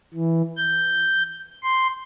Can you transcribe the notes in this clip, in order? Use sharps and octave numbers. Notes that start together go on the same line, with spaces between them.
E3
G6
C6